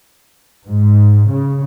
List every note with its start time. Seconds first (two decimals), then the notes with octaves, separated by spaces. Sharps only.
0.66 G#2
1.29 C#3